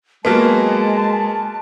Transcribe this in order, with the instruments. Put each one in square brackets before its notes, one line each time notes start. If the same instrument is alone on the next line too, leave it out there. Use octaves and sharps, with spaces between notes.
[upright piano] F#3 A#3 B3 [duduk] G#3 [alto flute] A5